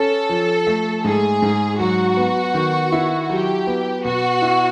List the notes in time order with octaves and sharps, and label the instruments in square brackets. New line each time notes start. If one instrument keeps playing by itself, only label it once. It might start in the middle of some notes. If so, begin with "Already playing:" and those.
Already playing: [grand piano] C#4 [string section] A4
[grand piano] F3
A3
[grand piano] G#2 [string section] G#4
[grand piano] G#2
[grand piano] F#3 [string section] F#4
[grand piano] B3
D#3
E4
[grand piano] F#3 [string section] G4
[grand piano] B3
[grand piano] B2 [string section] F#4
[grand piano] E4